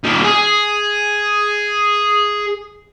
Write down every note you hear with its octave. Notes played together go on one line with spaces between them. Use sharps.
D#3 G3
G#4